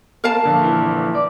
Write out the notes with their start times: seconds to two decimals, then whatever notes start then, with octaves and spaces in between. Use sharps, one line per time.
0.24 A#4 F5 A5
0.44 A#1 D3 A#3
0.63 E3
1.15 D5